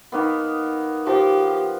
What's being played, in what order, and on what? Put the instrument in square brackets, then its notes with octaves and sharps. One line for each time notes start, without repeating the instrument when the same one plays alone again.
[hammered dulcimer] D#3 A#3 B3
[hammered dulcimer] F3 [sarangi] G4